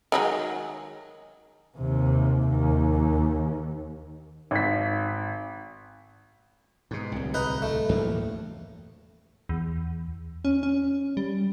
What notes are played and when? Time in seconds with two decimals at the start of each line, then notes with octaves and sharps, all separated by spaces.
0.12 D#3 F#3 G#3
1.77 D#2 C3
2.48 D#2
4.51 G#1 B6
6.91 G#2 B2
7.12 D1 C2
7.34 D#4 B4
7.62 A3
7.89 E2 A2 A#3
9.49 E2
10.45 C#4
10.63 C#4
11.17 G3